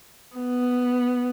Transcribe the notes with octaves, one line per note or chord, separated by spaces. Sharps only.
B3